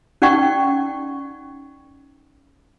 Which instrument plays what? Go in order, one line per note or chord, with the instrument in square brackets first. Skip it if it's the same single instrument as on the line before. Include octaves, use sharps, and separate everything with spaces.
[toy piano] C#4 D#4 D5 F#5 G5 C#6